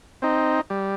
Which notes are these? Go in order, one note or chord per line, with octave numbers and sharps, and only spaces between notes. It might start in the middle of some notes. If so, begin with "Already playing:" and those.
C4 D#4
G3